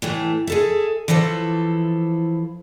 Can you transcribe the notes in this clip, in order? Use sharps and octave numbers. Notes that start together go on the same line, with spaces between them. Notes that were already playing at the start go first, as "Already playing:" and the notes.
A2 E3 A3
G#4 A4 E5
E3 F3 E4 A4 C5